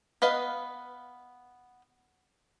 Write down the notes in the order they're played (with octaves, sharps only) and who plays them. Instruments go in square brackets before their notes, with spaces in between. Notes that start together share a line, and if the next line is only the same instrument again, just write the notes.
[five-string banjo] B3 B4 D#5 F5